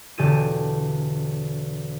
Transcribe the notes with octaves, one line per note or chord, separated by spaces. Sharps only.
E1 D3 G4 A4 G#5 D#7